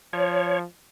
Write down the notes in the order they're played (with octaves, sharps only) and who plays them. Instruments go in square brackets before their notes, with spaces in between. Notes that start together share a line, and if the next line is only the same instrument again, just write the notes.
[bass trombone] F3 [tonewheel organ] C#5